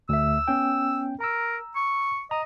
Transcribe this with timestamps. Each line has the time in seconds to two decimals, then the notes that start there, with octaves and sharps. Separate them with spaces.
0.09 D2 E5 E6
0.48 B3 C#4 G5
1.21 A#4 A#5 E6
1.76 C#6
2.31 D#5 A#5